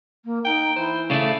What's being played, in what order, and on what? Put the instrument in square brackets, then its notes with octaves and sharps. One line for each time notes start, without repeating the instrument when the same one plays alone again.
[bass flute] A#3
[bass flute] D#4 [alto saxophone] G5
[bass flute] E3 [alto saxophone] C5
[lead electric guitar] C#3 A3 [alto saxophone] D5